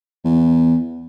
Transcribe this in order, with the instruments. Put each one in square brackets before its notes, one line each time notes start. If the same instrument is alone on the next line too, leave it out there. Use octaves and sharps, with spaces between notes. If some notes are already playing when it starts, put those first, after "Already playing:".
[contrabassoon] E2